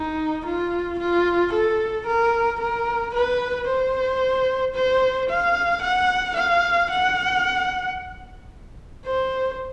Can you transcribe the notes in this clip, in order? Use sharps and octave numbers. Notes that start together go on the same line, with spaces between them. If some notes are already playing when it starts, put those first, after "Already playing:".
Already playing: D#4
F4
F4
A4
A#4
A#4
B4
C5
C5
F5
F#5
F5
F#5
C5